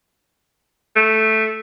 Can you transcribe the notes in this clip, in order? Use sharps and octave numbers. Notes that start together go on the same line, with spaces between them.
A3